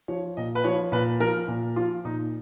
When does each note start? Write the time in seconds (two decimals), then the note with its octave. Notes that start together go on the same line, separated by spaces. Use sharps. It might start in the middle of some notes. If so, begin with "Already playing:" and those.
0.08 F3 C#5
0.37 A#2 D#5
0.55 B4
0.64 F3 C#5
0.92 A#2 B4
1.20 F3 A#4
1.48 A#2
1.76 F3 F4
2.05 A#2 D#4